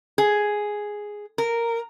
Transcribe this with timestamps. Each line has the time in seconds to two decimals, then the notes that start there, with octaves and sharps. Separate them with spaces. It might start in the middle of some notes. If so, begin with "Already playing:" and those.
0.18 G#4
1.38 A#4